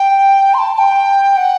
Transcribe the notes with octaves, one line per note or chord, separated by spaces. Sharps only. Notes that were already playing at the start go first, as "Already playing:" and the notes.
Already playing: G5
C6
A5
A5
G5
F#5